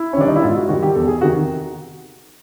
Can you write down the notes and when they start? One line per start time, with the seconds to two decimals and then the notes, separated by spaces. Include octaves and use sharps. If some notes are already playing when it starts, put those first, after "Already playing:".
Already playing: E4
0.13 C#4
0.17 D#3 G3 D4
0.27 D#4
0.36 E4
0.43 G#2 F4
0.56 F#4
0.69 D#3 G3 F#4
0.83 G4
0.95 E2 A4
1.08 G#4
1.21 C3 D#3 F#4